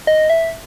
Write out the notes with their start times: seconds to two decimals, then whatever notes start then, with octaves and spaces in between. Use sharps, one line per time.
0.07 D#5
0.30 E5